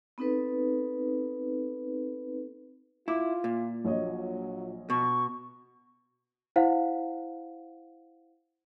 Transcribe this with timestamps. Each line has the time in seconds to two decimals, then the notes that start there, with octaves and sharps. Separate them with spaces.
0.18 B3 C4 D#4 A4 B4
3.08 E4 F4 D6
3.44 A#2
3.85 A#1 F#3 C#5 D#5
4.90 B2 C#6
6.56 E4 C5 F5 F#5